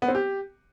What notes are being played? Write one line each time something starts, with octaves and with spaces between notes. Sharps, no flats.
B3
C4
G4